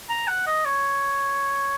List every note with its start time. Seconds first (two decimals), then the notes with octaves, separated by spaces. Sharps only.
0.10 A#5
0.28 F#5
0.47 D#5
0.65 C#5